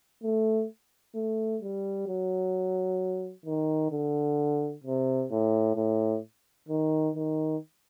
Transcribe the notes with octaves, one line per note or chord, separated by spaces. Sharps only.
A3
A3
G3
F#3
D#3
D3
C3
A2
A2
D#3
D#3